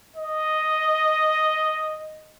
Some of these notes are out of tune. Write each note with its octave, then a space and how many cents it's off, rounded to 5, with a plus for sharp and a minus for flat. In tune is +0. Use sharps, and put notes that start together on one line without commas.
D#5 +0